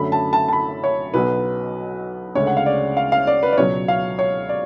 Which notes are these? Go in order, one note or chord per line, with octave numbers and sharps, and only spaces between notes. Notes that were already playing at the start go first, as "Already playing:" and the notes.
Already playing: F#2 D3 F#3 A3 C#4 B5
A5
A5
A5
B5
C#5
B1 B2 F#3 B3 B4
D2 C#3 G#3 C#5
F#5
F5
D5
F5
F5
D5
B4
D5
C#2 B2 F#3 C#5
F5
C#5
D5